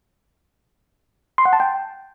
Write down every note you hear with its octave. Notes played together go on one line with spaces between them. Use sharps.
C6
F#5
A5
G5